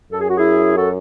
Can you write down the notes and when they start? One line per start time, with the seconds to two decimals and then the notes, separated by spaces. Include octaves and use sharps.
0.12 F#2 A4
0.21 G#4
0.29 F#4
0.38 E4 G#4
0.77 F#4 A4